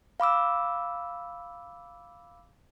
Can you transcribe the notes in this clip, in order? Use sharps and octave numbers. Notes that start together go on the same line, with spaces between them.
F5 B5 D6 E6